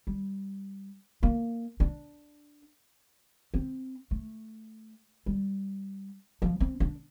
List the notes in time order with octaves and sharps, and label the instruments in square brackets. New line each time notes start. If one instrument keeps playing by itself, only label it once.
[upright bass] G3
A#3
D4
C4
A3
G3
F3
C4
D4